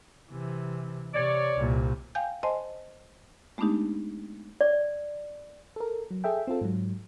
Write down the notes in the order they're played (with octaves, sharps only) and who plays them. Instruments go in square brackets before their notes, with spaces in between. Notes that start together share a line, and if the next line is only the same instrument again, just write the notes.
[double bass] C3 E3
[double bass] C3 [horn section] C#5 D5
[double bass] C2 A#2
[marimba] F5 G5 G#5 G6
C5 D#5 G#5 A5 C6
G#3 A3 B3 D4 D#4 G4
[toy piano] D5
[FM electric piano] A4 A#4
F#3
G#4 A4 E5 G5
C4 F4 A4
G#2 F#3